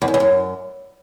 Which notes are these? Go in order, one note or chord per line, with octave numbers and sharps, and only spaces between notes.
E2
F#2
E2
F#2